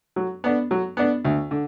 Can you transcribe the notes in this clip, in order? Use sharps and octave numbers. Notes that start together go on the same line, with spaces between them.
F#3
B3 D4
F#3
B3 D4
D2
D3